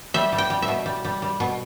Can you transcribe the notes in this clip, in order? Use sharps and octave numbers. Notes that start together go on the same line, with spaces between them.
G3 E5
G3
G5
G3
E5
B2
G3
G3
G3
B2